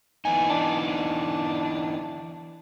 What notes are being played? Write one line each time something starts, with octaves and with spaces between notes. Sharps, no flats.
E3 B3 D#4 G#5
D4